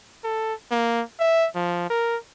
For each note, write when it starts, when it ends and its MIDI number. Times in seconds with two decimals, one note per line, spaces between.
0.24 0.54 69
0.71 1.02 58
1.20 1.48 76
1.55 1.87 53
1.90 2.17 70